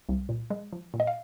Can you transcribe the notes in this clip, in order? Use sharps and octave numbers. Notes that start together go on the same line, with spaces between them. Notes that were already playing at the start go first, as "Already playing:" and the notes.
C2
A#2
G#3
F3
A#2
D#5
F5